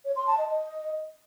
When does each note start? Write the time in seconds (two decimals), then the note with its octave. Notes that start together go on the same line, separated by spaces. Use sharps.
0.05 C#5
0.16 C6
0.27 A5
0.38 D#5
0.49 D#5